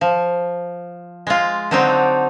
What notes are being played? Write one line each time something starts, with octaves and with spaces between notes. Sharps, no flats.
F3
G#3 F4
D3 F#3 C4 D4 D#4